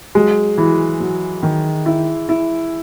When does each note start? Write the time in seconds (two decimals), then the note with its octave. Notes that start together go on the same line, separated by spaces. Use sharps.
0.15 F#3 G#3
0.58 E3 F#3
1.00 F#3
1.43 D#3
1.86 E4
2.29 E4